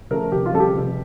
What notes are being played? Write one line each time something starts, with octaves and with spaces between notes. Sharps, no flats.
C#3 F3 A3 A#4
F1 G4
F4
F2 C#3 G3 A4
G4
F1